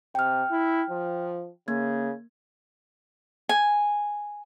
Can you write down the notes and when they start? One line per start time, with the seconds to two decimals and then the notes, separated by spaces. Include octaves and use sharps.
0.15 C3 G5 F6
0.51 E4
0.90 F3
1.68 C#3 A#3 G#6
3.49 G#5